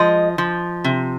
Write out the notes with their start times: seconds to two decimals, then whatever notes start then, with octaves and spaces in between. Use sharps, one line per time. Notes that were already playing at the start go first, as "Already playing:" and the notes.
Already playing: F3 G#3 D#5
0.38 F3
0.84 C3